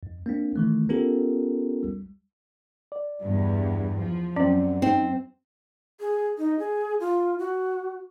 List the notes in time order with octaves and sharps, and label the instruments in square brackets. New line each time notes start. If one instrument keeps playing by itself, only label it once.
[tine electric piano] F2
A#3 C4 D4
D#3 E3 A3
B3 C#4 F4 G4 A4 A#4
G3
[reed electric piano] D5
[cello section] E2 G2
F3
[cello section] F#2 [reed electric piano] C4 D5 [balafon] C#4
[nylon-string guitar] C4 [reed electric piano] D#4
[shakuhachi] G#4
D#4
G#4
F4
F#4